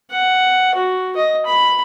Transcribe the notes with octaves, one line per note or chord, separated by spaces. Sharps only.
F#5
F#4
D#5
B5